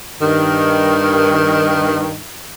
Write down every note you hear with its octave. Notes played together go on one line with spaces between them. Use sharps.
G2 D#3